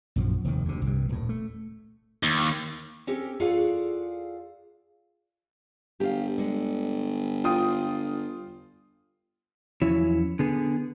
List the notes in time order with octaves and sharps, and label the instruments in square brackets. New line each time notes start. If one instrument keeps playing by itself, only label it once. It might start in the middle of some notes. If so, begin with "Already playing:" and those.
[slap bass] A#1 F#2 D#3 F3
F1 D#2 D#3
D2 C3
C2 G2
D#1 A2
A3
[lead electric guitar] D#2
[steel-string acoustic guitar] C4 C#4 G4 A4
F4 G#4 A4 D5 F5 F#5
[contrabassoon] G1 [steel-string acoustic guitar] G4 F5
[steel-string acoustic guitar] D3 G#3
[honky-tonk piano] F4 G5 D#6
[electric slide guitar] E2 F3 F#3 C#4 E4 C#5
D3 B3 G#4